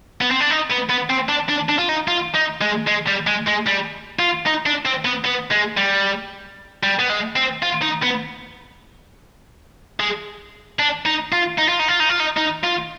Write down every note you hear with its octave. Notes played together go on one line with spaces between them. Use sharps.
B3
C4
D4
D#4
B3
B3
C4
D4
D4
D4
F4
D#4
F4
D#4
G#3
G#3
G3
G#3
G#3
G3
F4
D#4
D4
C4
B3
B3
G#3
G3
G3
B3
G#3
C4
F4
D#4
B3
G#3
D4
D#4
F4
D#4
F4
D#4
F4
D#4
F4
D#4
D#4
F4